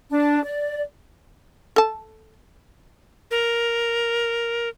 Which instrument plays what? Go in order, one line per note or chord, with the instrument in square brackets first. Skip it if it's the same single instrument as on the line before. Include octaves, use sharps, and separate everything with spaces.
[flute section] D4
D5
[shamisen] A4 A5
[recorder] A#4